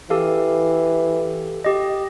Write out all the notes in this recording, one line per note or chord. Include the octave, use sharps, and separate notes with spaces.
E3 G4 A4 F5
G4 D#5